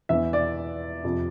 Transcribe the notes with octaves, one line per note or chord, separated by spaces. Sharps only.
E2 E3 E5
D5
F2 C3 F3